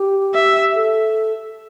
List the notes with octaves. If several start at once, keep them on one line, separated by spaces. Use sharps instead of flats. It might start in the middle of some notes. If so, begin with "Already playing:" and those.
Already playing: G4
E5
A4